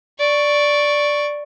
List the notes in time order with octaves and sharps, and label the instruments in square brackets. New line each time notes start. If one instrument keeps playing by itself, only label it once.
[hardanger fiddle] D5 C#6